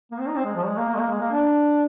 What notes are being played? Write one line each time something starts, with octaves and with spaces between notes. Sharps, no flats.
A#3
C4
D#4
C4
G#3
F3
G#3
A#3
A#3
G#3
A#3
G#3
A#3
D4